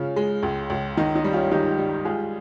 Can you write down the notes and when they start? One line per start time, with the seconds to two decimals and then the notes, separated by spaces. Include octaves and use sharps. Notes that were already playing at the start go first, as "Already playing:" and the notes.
Already playing: C#3 G#3 C#4 F4
0.16 G#3
0.43 C#2
0.70 C#2
0.97 D#3 D#4
1.15 D#4
1.24 G3
1.33 C#4 F4
1.51 D#3 D#4 G4
1.78 G3
2.05 G#3 F4 G#4